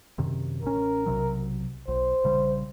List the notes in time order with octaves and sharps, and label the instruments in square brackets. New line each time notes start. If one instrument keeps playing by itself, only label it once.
[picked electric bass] F#2 C3 D#3
[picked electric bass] A1 C#4 [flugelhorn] A#4
[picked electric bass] B1 C3 F#3
[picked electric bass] B1 [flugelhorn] C5
[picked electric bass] A#1 C#3 G3